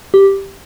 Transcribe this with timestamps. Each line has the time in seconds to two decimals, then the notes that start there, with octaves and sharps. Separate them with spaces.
0.14 G4